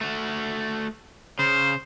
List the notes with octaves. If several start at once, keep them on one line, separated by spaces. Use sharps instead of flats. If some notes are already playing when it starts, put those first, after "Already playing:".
A3 F#4
C#3 C5